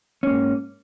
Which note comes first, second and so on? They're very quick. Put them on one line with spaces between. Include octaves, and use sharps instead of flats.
C#4 A#3 G#2